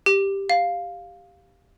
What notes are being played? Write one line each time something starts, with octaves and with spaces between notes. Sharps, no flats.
G4
F5